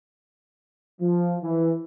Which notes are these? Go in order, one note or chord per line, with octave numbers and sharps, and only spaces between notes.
F3
E3